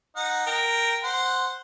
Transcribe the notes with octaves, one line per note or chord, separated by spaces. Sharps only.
D#4 F#5
A#4 G5 A#5
C5 F#5